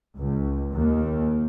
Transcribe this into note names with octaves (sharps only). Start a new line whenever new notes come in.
C#2
D#2